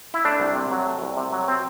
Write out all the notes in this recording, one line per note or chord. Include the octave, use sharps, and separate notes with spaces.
E4
A3 D4
C2
C3
F#3
A3
C2
C3
F#3
C4